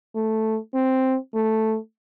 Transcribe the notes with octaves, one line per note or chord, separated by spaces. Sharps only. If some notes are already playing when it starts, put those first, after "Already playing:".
A3
C4
A3